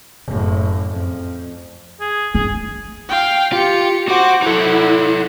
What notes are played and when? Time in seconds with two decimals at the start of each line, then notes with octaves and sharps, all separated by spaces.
0.24 F#1 A2
0.90 F2
2.01 G#4
2.35 G2 G#4
3.09 F5 G5
3.53 F4 G4 C#7
4.09 F#4 C5 F#5 D6
4.42 D#4 E4 A4 F#5